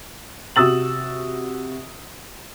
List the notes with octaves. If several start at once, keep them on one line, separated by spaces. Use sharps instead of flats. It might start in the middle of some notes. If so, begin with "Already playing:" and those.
C3 F#4 D#6 E6 A6 F#7